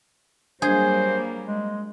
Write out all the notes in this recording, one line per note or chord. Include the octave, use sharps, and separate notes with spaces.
F#3 G3 A#3 D4 G#4 C5 G#5
G#3